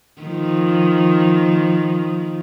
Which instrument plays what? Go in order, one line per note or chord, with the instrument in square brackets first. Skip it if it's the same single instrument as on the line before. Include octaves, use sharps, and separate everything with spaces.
[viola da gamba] D#3 F3